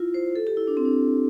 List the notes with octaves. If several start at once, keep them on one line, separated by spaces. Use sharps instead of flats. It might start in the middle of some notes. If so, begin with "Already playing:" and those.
Already playing: E4 F4
C5
A4
G4
E4
D4
C4
D4